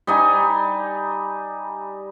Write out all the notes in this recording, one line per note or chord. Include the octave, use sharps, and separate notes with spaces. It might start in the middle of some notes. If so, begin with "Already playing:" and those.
G3 D#4 G#5